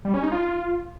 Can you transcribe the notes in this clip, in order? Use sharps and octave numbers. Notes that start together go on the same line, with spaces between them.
G3
C#4
D#4
F4